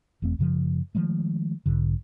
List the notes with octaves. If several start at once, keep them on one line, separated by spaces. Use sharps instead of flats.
F1 E2 A3 C4
F#2 C#3 F3
D#3 F3 G#3 A3
B1 G#2 D3